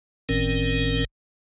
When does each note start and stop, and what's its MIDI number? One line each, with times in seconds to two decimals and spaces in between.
0.29 1.04 31
0.29 1.04 45
0.29 1.04 51
0.29 1.04 60
0.29 1.04 61
0.29 1.04 70